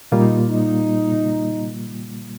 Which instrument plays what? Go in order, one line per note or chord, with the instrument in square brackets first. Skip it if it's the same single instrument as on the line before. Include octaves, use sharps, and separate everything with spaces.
[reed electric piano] A#2 G3 A#3 F4 [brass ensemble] D#4
[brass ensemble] D#4